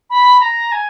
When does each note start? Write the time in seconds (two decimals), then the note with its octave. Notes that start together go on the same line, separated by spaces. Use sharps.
0.10 B5
0.41 A#5
0.72 G#5